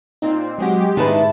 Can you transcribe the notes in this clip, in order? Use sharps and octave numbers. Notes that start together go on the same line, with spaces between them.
A#2 C4 D#4
F#3 G#3 C4 F#4 G4
G#2 D#3 G#3 D4 E4 B4 A5